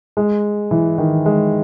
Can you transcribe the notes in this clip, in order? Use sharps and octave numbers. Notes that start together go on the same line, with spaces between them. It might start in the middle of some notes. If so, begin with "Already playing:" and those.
G#3
E3
D#3
G#3